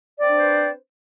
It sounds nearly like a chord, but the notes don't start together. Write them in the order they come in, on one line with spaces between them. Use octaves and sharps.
D5 C4 D4 C5 B4